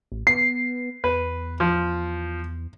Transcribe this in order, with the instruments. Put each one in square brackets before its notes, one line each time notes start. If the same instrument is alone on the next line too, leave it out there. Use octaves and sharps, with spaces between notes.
[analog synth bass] A1
[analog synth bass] B3 [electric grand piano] C7
[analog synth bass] E2 [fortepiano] B4
[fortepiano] F3